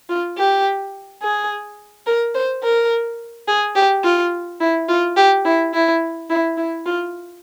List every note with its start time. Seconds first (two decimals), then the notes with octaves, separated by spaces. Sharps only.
0.09 F4
0.38 G4
1.22 G#4
2.07 A#4
2.35 C5
2.63 A#4
3.48 G#4
3.76 G4
4.04 F4
4.60 E4
4.89 F4
5.17 G4
5.45 E4
5.74 E4
6.30 E4
6.57 E4
6.86 F4